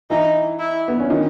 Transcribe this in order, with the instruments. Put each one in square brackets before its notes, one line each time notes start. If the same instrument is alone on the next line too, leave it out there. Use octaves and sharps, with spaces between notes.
[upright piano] E3 E4 [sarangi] D#4
[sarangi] E4
[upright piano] B3
C#4
D#3 D#4